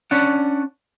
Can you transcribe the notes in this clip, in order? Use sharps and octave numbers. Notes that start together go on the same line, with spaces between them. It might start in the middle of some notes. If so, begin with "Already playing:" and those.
C#4 D4 F#5